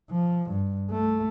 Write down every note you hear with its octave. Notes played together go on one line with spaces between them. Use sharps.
F3
G2
A3